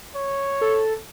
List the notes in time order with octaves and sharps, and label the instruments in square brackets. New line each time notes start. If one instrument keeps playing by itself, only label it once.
[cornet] C#5
[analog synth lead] A4